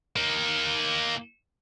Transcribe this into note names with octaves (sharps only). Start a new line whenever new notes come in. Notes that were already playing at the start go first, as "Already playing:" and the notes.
A#3 D#4